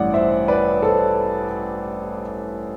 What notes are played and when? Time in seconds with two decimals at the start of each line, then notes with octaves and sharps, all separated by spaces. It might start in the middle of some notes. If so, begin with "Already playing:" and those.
Already playing: A1 G2 E3 D5 F#5
0.14 C5 E5
0.48 B4 D5
0.83 A4 C5